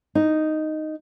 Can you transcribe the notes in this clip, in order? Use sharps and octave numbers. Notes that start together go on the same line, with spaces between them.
D#4